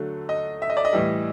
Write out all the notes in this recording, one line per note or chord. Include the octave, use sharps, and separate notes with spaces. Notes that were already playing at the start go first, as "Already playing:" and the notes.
Already playing: D3 F#3 A3
D#5
E5
D#5
D5
D#5
A2 E3 G3